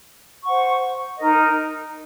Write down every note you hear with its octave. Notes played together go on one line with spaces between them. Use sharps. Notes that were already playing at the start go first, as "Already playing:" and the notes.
C5 F#5 C#6
D#4 A#4 D#5